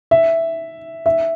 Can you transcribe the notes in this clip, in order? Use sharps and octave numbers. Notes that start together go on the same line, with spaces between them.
E5
E5